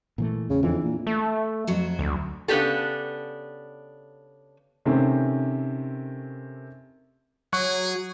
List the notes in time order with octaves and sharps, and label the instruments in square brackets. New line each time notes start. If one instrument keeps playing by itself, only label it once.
[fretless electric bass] A#2 E3 A3
[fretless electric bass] E2 [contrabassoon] C#3
[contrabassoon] F2 [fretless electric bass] E3 C4 D4
[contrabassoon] A#2
[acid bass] A3
[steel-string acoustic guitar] F2 F#3 F#4
[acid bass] D2
[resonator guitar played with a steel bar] C#3 B3 C#4 D4 G4 A4
[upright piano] C3 D#3 A3 C4 C#4
[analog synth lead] F#3 [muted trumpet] G#4 [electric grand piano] C#6 F#6